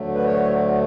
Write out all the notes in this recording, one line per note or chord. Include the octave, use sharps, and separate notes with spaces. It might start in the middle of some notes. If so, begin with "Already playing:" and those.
Already playing: D2 D3 F#3 A3
B4
C#5